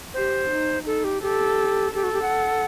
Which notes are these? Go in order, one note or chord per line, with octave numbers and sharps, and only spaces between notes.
G4 C5
D#4
D#4 A4
G4
G4 A4
G4 A4
F#4
G4
F#5